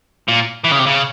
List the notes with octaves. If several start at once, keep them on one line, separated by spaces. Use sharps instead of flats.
A#2
E3
C#3
C3
C#3